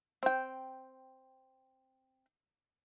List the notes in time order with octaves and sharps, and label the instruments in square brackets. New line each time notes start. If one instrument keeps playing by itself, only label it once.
[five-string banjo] C4 G5